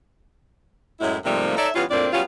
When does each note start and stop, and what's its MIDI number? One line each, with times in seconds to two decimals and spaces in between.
1.00 1.17 42
1.00 1.17 45
1.00 1.17 54
1.00 1.17 56
1.00 1.17 64
1.25 1.55 44
1.25 1.55 48
1.25 1.55 53
1.25 1.55 55
1.25 1.55 57
1.25 1.55 58
1.57 1.69 63
1.57 1.69 69
1.57 1.69 73
1.57 1.69 74
1.57 1.69 76
1.75 1.85 52
1.75 1.85 55
1.75 1.85 59
1.75 1.85 61
1.75 1.85 65
1.90 2.07 41
1.90 2.07 45
1.90 2.07 58
1.90 2.07 60
1.90 2.07 62
1.90 2.07 74
2.13 2.22 54
2.13 2.22 55
2.13 2.22 59
2.13 2.22 61
2.13 2.22 65